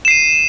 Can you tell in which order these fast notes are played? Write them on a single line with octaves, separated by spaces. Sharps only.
E7 C7 D#7